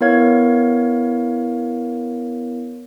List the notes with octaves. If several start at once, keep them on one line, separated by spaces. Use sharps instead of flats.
B3 E4 A#4 C#5 F5 G#6